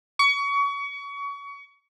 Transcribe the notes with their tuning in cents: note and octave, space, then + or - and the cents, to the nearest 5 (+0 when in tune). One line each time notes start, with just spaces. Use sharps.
C#6 +30